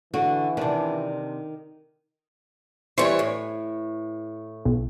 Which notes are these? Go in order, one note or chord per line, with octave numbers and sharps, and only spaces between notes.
D3 E3 F#4
C3 D#3 D4
E3 G3 C5 C#5 C#6
A2
B1